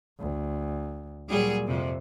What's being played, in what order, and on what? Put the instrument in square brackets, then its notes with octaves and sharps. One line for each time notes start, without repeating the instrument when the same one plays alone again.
[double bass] D2
[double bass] A#2 [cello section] F#3 G3 G#4
[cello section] F2 C3